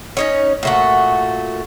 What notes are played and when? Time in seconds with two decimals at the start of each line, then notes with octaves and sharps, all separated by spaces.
0.17 C#4 D#4 C#5
0.63 A#2 A3 F#4